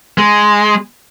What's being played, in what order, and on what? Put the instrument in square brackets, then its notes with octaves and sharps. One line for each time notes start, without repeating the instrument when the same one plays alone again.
[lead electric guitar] G#3